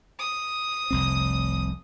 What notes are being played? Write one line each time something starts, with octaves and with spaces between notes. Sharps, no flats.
D#6
F1 C2 C4